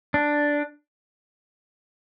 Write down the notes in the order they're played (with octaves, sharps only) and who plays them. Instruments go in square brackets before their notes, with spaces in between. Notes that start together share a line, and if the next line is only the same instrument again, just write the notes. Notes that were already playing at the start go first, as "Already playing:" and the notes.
[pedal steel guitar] D4